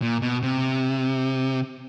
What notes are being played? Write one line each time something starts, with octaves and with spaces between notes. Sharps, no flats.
A#2
B2
C3